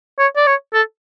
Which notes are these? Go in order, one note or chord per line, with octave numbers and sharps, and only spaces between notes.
C#5
D5
C#5
A4